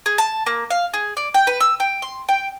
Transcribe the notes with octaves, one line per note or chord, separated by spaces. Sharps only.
G#4
A5
A#3
F5
G#4
D5
G5
B4
E6
G5
C6
G5